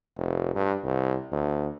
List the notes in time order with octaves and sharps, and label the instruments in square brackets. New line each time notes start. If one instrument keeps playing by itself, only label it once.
[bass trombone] F1
G2
C2
D2